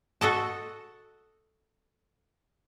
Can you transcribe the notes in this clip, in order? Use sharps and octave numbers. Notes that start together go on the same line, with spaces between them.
F#4 A4 D#5 A5